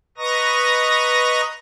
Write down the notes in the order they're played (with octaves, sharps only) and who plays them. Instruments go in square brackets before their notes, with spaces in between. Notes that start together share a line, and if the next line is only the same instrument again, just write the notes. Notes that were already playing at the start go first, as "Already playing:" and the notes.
[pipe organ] B4 D#5 A#5 C#6 D#6 A#6